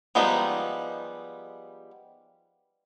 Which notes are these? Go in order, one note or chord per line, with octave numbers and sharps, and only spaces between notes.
F3 G3 G#3 B3 D#4